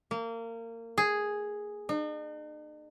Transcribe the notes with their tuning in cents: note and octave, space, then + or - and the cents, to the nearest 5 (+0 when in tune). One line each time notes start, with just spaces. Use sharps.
A#3 -25
G#4 +0
D#4 -45